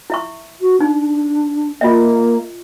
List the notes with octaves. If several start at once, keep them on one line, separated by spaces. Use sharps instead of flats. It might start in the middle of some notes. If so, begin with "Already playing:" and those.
E4 E5 C#6
F#4
D4 D#4
A#3 F4 D#5 E5